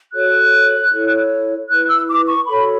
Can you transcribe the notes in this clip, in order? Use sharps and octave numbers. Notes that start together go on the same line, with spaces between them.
F#4 A4 C#5 F#6
E4 A4 C#5
E4 B4 F#6
E6
D6
C#6
F#4 A4 C#5 B5